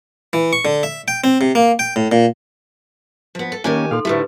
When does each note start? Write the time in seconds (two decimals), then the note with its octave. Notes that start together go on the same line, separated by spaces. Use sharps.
0.33 E3
0.53 C#6
0.65 D3
0.83 E5
1.08 G5
1.24 C4
1.41 C3
1.55 A#3
1.79 G5
1.96 A2
2.12 A#2
3.35 F3 B3
3.52 A4
3.64 D#3 A#3 C#4 G4 G#5
3.91 A#2 D#4 A4 F5 C6
4.05 D2 A2 A3 E4 G4 B4